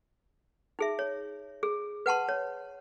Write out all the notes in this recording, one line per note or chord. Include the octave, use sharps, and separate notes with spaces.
D#4 G#4 E5
C#5
G#4
B4 F#5 A5 C6
C#5